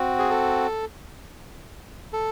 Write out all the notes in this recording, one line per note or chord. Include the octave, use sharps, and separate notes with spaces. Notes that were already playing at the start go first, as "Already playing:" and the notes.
Already playing: C4 F#4
G#4
A4
A4